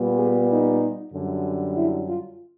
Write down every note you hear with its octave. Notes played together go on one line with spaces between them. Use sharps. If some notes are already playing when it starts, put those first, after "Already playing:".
Already playing: A#2 G3 B3
G#4
D#4
F#2 D3 G3
E4
F4